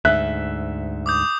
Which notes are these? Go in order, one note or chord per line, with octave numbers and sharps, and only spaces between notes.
D2 G#2 E5 F#6
D6 D#6 G6